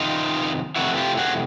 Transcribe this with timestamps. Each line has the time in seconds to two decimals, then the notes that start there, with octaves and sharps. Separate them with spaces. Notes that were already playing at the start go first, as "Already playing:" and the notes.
Already playing: F2 C3 D#3 D#4 F4
0.76 F2 C3 E3 A3 E4 F#4
0.97 F4 G4
1.18 F#4 G#4